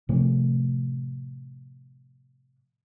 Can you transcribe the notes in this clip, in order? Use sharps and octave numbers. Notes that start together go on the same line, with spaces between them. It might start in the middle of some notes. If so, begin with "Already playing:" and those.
A2 C3 F3 A3